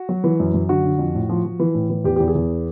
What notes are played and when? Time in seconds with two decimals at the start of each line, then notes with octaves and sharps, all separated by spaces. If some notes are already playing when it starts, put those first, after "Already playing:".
Already playing: F#4
0.09 F#3
0.24 E3
0.40 F#2
0.54 F#2
0.69 D3 F#4
0.84 D3
0.99 F2
1.15 A2
1.29 F3
1.45 F3
1.59 E3
1.75 A2
1.90 E3
2.04 E2 G4
2.16 E2 G4
2.28 G#4
2.35 E2